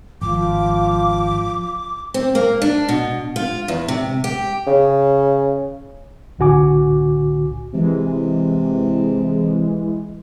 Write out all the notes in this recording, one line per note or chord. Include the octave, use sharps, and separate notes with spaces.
G#1 F3 D6
C4
A#3
D4
B2
F4
E2
C3
G4
C#3
C2 A2 D3 F#4 G#5 D6
C3 E3 G#3